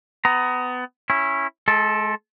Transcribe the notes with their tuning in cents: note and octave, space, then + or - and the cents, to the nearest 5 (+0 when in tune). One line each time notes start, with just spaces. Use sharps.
B3 +25 A#5 +0
C#4 -15 E4 +0
G#3 +35 A4 +0